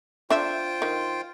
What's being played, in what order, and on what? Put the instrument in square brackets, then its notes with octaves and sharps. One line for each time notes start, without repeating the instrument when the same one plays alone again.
[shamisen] D4 E5 [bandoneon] F4 C5 G5
[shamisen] D#3